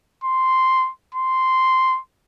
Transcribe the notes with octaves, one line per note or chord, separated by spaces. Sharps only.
C6
C6